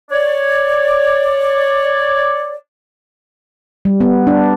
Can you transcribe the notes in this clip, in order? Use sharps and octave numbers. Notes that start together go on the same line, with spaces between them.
C#5 D5
G3
B3
D4